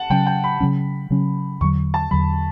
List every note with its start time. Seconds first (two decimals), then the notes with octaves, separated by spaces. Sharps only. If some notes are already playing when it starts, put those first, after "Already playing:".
Already playing: F#5 A5
0.10 C#3 F#3 C#4 G5
0.27 G5
0.44 B5
0.60 C#3 F#3 C#4
1.10 C#3 F#3 C#4
1.61 E2 D3 F#3 C#6
1.94 A5
2.11 E2 D3 F#3 B5